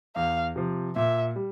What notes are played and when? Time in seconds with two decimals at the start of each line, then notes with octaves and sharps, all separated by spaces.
0.16 E2 F5
0.56 C3 F3
0.96 A#2 E5
1.36 G3